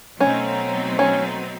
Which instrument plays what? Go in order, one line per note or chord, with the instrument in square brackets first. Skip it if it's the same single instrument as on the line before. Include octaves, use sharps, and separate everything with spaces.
[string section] B2 F#3 A3 C4 D#4 [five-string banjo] C#4
[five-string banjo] C#4